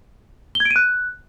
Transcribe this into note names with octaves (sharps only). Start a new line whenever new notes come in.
G7
G#6
D7
D#7
F#6